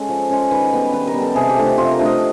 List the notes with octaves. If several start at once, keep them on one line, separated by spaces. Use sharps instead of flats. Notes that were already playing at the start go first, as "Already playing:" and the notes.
Already playing: G#3 C#4 A4
F3
G#3 C#4
D#3 B4
G3 B3
D#3 B4
A#4
G3 B3
A4
C3 G#4
G4
F3 A3 D4
C3 F4
A#4
F3 A3 D4
D#5